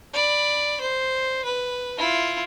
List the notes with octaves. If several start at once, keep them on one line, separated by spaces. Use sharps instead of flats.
D5 B5
C5
B4
E4 F4